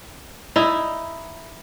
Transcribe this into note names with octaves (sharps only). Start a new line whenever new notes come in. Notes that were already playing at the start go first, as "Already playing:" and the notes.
D#4 E4